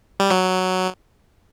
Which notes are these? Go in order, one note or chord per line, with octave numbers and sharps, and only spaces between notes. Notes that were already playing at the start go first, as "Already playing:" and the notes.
G3
F#3